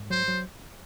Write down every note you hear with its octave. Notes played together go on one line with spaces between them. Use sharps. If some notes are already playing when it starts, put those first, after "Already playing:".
Already playing: G#2
F#3 C5
F#3